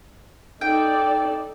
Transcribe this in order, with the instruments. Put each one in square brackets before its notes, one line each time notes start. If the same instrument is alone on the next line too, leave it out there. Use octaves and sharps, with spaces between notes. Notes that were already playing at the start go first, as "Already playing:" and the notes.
[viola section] D#4 A4 D5 [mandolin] G5